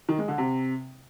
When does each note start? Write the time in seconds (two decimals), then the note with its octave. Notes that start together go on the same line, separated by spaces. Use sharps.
0.09 D#3
0.18 G#3
0.28 D3
0.38 C3